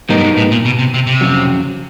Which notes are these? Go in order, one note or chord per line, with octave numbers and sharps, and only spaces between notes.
G#2 F#3 B3 D#4 G4 A#4
G2
G#2
A2
A#2
B2
C3
C3
C3
F2 C#3 F#3